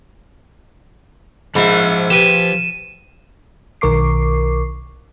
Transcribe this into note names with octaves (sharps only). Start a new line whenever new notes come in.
G#2 F3 E4 B5
G4 B4 G#5 D#7 E7
B1 D#3 A#4 C#6 D6 C7